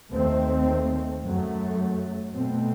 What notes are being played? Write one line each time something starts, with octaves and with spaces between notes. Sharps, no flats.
D#2 D#3 A3 C4
F#2 F#3 A3
B2 A3 C4